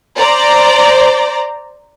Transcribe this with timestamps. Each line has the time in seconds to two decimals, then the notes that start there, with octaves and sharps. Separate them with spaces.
0.18 C5 D5 A#5